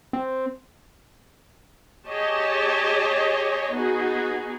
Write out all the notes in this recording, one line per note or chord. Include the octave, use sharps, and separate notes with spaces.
C4
G4 G#4 C#5 D#5 A5
B3 D#4 F#4 G#4